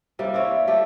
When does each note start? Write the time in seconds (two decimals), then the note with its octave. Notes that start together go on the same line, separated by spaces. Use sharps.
0.19 C3 G3 A#3
0.34 C4 E4 C#5
0.67 G3 A3 G4 A4